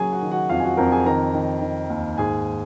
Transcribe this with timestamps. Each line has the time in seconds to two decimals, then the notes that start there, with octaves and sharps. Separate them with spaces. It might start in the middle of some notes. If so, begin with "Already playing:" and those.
Already playing: C#3 F#3 A#3 G#4 G#5
0.13 F#4 F#5
0.22 D#3
0.31 F#4 F#5
0.50 F2 F4 F5
0.60 G#5
0.63 F#4 F#5
0.77 F2 A#4 A#5
0.92 G#4 G#5
1.05 D#3 A#4 A#5
1.34 D#3
1.61 D#3
1.90 D#2
2.17 G#2 G#4 G#5